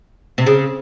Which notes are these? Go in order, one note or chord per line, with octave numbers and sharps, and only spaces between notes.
C3
C#3